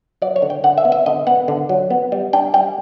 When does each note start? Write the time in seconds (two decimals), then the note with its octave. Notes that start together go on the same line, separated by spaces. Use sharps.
0.22 F#3 D5
0.36 C#5
0.42 D3
0.50 G5
0.64 D3 F#5
0.78 E5
0.85 B3
0.92 E5
1.06 D3 D#5
1.27 B3 F#5
1.48 D3
1.69 F#3
1.90 B3
2.12 G3
2.33 D4 G5
2.54 G3 G5